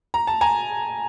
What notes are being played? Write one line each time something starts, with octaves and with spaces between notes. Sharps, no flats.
A#5
A5
G#5 A#5